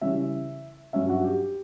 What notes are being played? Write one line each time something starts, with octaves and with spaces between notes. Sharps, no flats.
C#3 E3 G3 C#4 E5
G2 F#3 C#4 E5
F#4
G4